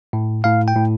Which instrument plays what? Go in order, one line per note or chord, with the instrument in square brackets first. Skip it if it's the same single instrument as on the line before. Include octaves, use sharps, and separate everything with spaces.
[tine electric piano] A2
A2 F5
G5
A2